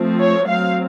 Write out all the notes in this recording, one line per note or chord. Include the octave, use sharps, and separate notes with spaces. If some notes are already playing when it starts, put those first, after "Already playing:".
Already playing: F3 A3 C4
C#5
F#3 C4 F5